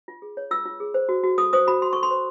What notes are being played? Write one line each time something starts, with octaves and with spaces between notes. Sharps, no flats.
F4
G#4
C#5
F4 E6
F4
G#4
C5
F#4
F#4
A4 D#6
C5 D#6
F#4 B5
F#4 C6
A4 C#6
C6
C5